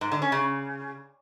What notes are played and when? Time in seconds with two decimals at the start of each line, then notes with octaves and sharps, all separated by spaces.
0.01 G#2
0.12 D3
0.22 C#4
0.32 C#3